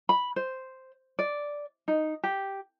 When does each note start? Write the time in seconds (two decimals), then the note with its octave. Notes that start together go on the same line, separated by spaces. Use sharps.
0.09 B5
0.36 C5
1.19 D5
1.88 D#4
2.24 G4